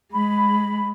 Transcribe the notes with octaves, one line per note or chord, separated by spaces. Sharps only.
G#3 B5